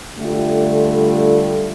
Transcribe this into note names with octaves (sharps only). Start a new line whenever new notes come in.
D3 G3 A3 F4 A4